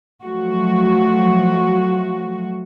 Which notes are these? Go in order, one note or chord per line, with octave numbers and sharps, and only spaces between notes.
F3 F#3 A3 F#4